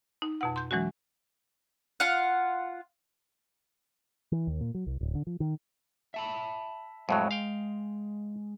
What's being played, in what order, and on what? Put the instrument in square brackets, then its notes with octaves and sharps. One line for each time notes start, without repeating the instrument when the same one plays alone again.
[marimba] D#4
F2 B2 F#5
C6 G6
E3 F#3 G#3 C#4 F#4
[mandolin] F4 F5 F#5
[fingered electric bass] E3
D#2
A#2
F#3
C2
D1
D3
F3
D#3
[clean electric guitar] E5 A5 B5
[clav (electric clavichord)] F2 A2 F#3 [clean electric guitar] G#3
[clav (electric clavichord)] F5 G5